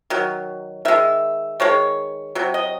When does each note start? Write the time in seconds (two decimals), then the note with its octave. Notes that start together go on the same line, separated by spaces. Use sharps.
0.10 D#3 F#3
0.85 D#3 G#3 E5
1.60 D#3 G#3 C#5
2.35 C3 F#3
2.54 D#5